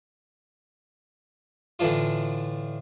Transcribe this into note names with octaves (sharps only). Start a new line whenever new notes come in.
A2 D3 E3 D4 F4